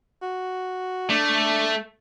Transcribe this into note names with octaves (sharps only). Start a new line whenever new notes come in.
F#4
A3 D4